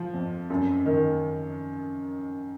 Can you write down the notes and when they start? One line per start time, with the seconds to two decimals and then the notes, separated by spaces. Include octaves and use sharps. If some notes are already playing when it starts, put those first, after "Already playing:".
Already playing: F3
0.13 F2
0.50 F#2
0.86 D#3